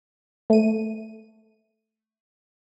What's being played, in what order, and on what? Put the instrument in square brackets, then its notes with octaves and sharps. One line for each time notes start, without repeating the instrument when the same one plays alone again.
[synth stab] A3 D#7